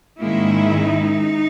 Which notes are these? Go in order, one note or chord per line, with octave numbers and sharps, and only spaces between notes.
G#2 D#3 G#3 A#3 C#4 E4
D#4